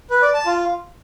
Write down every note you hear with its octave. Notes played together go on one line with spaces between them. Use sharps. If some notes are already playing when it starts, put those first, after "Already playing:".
B4
D5
A5
F4